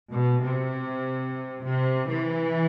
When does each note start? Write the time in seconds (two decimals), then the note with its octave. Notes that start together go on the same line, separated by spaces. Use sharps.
0.11 B2
0.41 C3
1.62 C3
2.08 E3